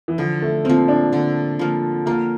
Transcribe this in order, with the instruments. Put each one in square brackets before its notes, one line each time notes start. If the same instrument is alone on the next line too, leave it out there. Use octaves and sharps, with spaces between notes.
[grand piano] E3
[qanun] D3 [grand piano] F3
[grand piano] A3
[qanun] F3 A#3 [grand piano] C4
[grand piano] D4
[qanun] D3
F3 A#3
[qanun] A#3 [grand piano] F4